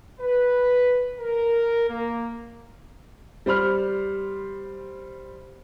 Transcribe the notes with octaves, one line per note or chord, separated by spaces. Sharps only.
B4
A#4
A#3
G3 C5 B5 F6